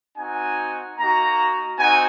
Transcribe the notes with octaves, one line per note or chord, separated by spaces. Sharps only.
C4 D#4 F#4 G#5
A#3 D#4 F#4 A#5
C4 D#4 F#4 G#5